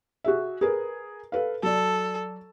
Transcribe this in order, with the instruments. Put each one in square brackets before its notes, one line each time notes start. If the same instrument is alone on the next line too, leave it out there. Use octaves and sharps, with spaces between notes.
[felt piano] F#4 G#4 E5
G#4 A#4 B4
A4 B4 F5
[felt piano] F#3 D5 [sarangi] A4